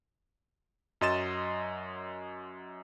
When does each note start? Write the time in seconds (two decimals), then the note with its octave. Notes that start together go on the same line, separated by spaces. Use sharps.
1.01 F#2 F#3 D#5 C6 A6 E7